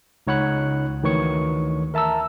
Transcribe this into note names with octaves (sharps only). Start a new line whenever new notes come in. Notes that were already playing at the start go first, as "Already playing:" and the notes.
C#2 D#4 C#5 F#5 B5 F#6
D2 D#3 E3 C#5 C#6 C#7
A#4 E5 A5 A#5 E6